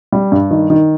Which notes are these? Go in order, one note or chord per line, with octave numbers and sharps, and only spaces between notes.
G3
G2
D#3
D#3